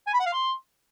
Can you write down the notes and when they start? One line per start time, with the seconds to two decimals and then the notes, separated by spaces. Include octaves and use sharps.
0.07 G#5
0.13 B5
0.20 F#5
0.26 F5
0.33 C6